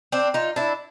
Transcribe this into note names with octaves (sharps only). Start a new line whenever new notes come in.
C4 D4
D#4 F4
D4 E4